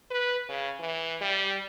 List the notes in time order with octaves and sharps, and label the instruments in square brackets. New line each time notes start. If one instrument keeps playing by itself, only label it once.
[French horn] B4
C#3
E3
G3